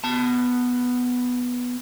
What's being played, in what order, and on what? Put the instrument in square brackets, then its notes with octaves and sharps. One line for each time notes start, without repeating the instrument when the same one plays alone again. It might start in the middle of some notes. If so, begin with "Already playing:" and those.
[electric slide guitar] B3 A5